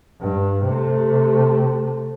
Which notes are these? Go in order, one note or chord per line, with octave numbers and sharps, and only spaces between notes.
G2
C3 A3